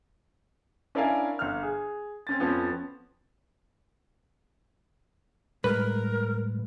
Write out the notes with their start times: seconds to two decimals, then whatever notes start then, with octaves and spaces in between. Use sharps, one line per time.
0.95 C#4 D4 E4 A#4 F5 G#5
1.39 G1 F6
1.63 G#4
2.27 C4 C#4 A6
2.40 F2 F3 B3 C#4
5.64 A2 G3 G#3 A#4 B4